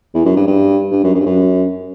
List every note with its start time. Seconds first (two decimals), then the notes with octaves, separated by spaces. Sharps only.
0.14 E2
0.25 F#2
0.36 G2
0.47 G2
0.91 G2
1.04 F#2
1.15 F#2
1.20 G2
1.26 F#2